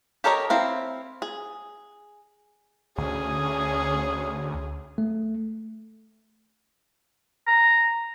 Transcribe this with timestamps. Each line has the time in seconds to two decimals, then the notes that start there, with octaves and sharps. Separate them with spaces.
0.24 G4 A4 A#4 C#5 D#5
0.50 C4 E4 F5
1.22 G#4
2.98 D2 C#4 G#4
4.98 A3
7.47 A#5